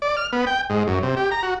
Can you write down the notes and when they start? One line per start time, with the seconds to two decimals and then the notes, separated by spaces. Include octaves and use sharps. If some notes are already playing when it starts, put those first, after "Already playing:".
0.02 D5
0.17 F6
0.32 B3
0.47 G5
0.70 G#2
0.87 F#2
1.02 C3
1.17 G4
1.31 A#5
1.43 F#4